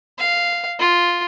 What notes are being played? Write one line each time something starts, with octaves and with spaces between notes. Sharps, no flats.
F5
F4